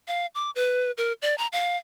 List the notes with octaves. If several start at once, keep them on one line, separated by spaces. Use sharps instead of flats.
F5
D6
B4
A#4
D5
A#5
F5